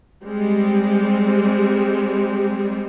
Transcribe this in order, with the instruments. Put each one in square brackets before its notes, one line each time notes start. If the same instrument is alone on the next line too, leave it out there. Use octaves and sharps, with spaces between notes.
[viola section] G3 G#3 C4